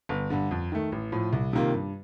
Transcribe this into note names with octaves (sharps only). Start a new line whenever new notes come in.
G1
G2 D3
F2
D#3 A3
A1
A2 F3
C2
C3 D#3 A#3 F4
G2